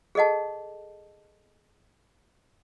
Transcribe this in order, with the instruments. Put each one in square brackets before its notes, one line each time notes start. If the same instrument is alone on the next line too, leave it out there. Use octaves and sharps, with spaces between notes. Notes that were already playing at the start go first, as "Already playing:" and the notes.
[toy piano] G#4 A4 D#5 F#5 A5